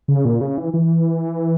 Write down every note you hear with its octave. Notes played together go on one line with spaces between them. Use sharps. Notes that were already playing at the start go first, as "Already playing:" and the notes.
C#3
A#2
C#3
E3
E3